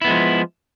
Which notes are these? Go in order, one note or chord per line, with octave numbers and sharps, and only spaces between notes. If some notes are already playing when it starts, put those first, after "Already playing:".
F3 G#3 B3 E4